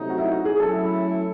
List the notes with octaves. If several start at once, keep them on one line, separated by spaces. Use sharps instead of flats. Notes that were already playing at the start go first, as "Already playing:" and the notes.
Already playing: C3 F#3 A3 D#4
F#4
E4
F#4
G#4
F#3 A3 C#4 E4 A4